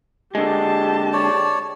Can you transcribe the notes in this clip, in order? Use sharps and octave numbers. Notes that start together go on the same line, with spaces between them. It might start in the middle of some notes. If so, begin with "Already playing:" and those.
D3 G#3 G4 A5
C#5 D5